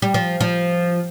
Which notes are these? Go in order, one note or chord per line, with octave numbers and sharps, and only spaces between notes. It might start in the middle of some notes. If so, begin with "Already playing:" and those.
G3
F3
F3